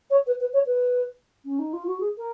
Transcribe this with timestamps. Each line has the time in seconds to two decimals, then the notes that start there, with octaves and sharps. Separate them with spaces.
0.10 C#5
0.27 B4
0.41 B4
0.53 C#5
0.66 B4
1.45 C#4
1.59 D#4
1.73 F4
1.87 F#4
2.00 G#4
2.18 A#4